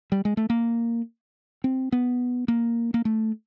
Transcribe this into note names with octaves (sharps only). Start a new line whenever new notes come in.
G3
G#3
A3
A#3
C4
B3
A#3
A#3
A3